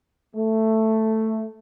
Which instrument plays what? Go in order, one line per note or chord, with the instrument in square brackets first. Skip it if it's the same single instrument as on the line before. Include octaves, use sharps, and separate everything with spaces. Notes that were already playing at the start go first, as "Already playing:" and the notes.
[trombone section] A3